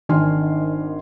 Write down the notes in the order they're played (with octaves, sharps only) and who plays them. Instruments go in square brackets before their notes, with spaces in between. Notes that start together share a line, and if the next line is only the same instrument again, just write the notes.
[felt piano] G#1 D#3 D4 G#5 C6 F6